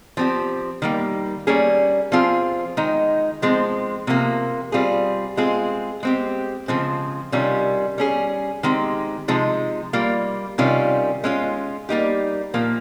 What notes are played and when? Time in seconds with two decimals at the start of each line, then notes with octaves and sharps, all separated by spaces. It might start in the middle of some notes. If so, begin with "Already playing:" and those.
0.17 F3 C4 G4
0.82 D#3 G3 A#3
1.47 G3 A#3 C#4 G#4
2.12 F3 C4 F4 G#4
2.77 D#3 G#3 D#4
3.42 F3 G#3 C4
4.07 C3 F3 A#3
4.72 G3 C4 F4 G#4
5.37 G#3 C4 F4 G#4
6.03 G#3 C4 G4
6.68 C#3 F3 G#3 C4
7.32 C3 D#3 G3 C#4 F4
7.98 G3 C#4 G#4
8.63 D#3 G#3 C4 G4
9.28 C3 F3 G#3 D#4
9.93 G3 A#3 F4
10.58 C3 D#3 G3 C#4 F4
11.24 G#3 C#4 F4
11.89 G3 A#3 D#4 G4
12.54 A#2 F3 A#3